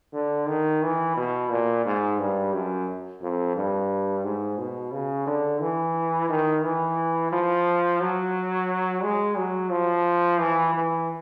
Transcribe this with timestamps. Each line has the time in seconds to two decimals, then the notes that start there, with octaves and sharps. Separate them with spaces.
0.13 D3
0.48 D#3
0.83 E3
1.17 B2
1.50 A#2
1.86 G#2
2.19 G2
2.53 F#2
3.22 F2
3.56 G2
4.24 G#2
4.58 B2
4.92 C#3
5.27 D3
5.61 E3
6.30 D#3
6.63 E3
7.32 F3
8.00 F#3
9.03 G#3
9.37 F#3
9.71 F3
10.39 E3
10.74 E3